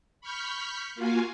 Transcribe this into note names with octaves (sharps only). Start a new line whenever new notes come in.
B5 C#6 F6 G6 B6
A#3 F4 F#4 F5 G#5